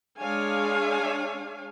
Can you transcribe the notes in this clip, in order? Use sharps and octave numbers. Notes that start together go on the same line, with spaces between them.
G#3 D4 C#5 F5 G#5